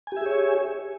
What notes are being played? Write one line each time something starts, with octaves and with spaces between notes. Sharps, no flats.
G4 G#4 C#5 E5 G#5